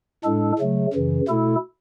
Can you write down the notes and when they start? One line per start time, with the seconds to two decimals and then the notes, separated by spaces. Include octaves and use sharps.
0.24 A2 G#3 D4 A4
0.59 C#3 F#3 A3
0.93 F#2 C#3 E3
1.28 B2 A3 E4 A4